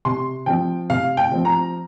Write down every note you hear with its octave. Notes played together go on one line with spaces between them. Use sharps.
C3 C6
F3 C4 G5
C3 F5
G5
F3 C4
A#5